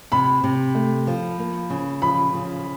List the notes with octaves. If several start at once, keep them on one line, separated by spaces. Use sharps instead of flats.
C3 B5
C3
A3
F3
A#3
C#3
F3 B5
C#3